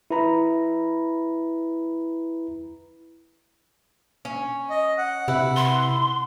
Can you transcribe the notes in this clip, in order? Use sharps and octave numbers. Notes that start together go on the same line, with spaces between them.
E4 B4 A#5 B5
C#4
D#5
F#5
C3 E4 B4
C6